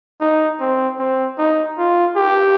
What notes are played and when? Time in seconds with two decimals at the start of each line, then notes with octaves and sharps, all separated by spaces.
0.21 D#4
0.60 C4
0.99 C4
1.38 D#4
1.78 F4
2.17 G4